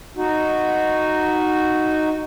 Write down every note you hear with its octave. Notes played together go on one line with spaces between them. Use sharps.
D#4 F#4